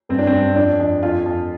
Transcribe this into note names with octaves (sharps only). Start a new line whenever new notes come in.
G2 C4
D4
C4
G2
F2 D4
F2
F2 F4
F2